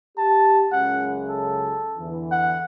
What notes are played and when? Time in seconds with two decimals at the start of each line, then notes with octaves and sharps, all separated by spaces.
0.18 G4 A5
0.72 C#2 F#2 C#3 F#5
1.29 A4
1.98 E2 D3 E3
2.32 F#5